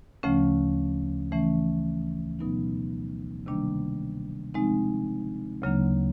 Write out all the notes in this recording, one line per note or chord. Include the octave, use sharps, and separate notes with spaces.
D2 C#3 F3 A3 C#4
C#3 E3 A3 C#4
B2 F#3 B3 D#4
C3 D#3 G3 A#3 D4
C3 F3 G#3 C4 D#4
D2 C#3 F#3 A#3 D4